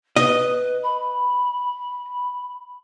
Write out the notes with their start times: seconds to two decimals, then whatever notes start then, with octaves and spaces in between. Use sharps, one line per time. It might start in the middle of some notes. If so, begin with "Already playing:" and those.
0.16 B4 D#5
0.83 B5